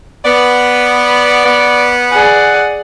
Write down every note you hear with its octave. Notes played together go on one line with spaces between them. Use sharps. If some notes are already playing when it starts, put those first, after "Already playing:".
B3 D5
B3
G#4 D5 F#5